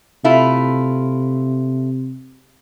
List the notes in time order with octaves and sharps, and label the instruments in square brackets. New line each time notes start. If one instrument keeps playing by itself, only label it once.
[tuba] C3 [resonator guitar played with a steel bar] A3 E4 F4